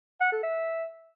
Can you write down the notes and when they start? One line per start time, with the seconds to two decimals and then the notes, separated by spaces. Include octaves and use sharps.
0.21 F#5
0.32 A4
0.43 E5